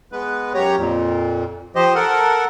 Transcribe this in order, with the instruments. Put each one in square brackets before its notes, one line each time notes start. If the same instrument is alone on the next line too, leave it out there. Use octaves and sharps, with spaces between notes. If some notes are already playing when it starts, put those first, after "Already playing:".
[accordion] G#3 B3 B4
F#2 G4 C#5 A#5
F2 A#2
F3 G4 C5 D#5
A4 A#4 F#5